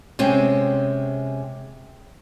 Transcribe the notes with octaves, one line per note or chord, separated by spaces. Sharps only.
C3 G#3 C4 C#4